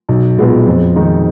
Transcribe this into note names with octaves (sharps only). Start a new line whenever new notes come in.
B1
A#2 G#3 B3
F2
D#3 G#3 D#4